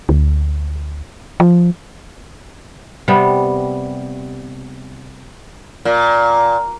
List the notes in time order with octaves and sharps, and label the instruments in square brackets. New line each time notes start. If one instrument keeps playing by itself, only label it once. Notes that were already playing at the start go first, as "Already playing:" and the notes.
[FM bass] D2
F3
[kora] C3 G3 B3
[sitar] A#2